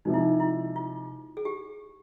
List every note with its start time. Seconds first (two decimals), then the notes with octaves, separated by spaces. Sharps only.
0.05 C3 F3 G#3 D#4
0.14 E4
0.21 D#4
0.40 E4
0.76 F4
1.37 G#4
1.45 G4